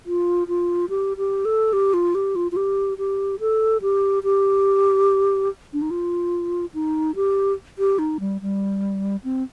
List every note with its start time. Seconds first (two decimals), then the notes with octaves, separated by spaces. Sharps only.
0.06 F4
0.48 F4
0.89 G4
1.17 G4
1.45 A4
1.73 G4
1.94 F4
2.15 G4
2.36 F4
2.52 F4
2.56 G4
2.98 G4
3.40 A4
3.82 G4
4.23 G4
5.73 D4
5.82 D#4
5.91 F4
6.74 D#4
7.16 G4
7.78 G4
7.99 D#4
8.20 G3
8.41 G3
9.24 C4